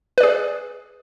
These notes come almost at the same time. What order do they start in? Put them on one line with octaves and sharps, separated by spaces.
B4 D5 G#4